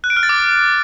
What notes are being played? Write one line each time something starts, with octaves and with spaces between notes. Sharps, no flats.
F#6
D7
F6
A6
D6